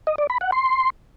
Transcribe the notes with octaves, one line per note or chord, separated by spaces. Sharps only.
D#5
D5
B5
F#5
C6